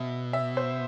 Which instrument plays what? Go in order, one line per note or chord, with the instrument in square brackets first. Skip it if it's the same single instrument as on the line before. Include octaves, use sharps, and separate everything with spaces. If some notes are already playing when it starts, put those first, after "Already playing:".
Already playing: [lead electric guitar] B2 [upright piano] E5
[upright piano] E5
C5